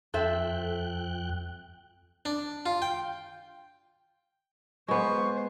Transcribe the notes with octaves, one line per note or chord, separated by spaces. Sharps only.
F2 A4 C5 E5 G5 F#6
D4
F4
G5
G#3 B3 C5 C#6